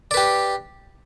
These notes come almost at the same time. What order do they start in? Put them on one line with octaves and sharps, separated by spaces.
D5 B4 G4